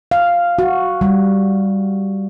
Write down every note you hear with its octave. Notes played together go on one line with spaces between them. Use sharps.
F5
F#4
G3